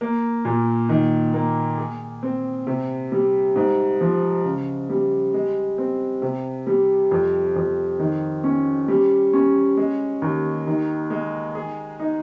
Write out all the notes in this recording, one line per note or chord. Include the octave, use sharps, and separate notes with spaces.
A#3
A#2
D#3
A#3
G#4
C4
C3
G3
G#2
F3
C#3
G3
G#3
C4
C3
G3
F2
F2
D#3
C#4
G3
C#4
G#3
D#2
D#3
G#3
G#4
D#4